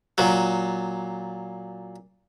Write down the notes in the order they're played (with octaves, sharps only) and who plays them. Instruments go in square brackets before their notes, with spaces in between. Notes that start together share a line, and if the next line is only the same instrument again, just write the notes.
[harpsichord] A#2 F#3